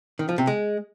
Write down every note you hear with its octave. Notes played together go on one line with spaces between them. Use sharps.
D#3
F3
C3
G#3